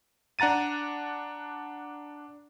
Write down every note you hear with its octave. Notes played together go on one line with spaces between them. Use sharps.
D4 F#5 A#5 A6 D#7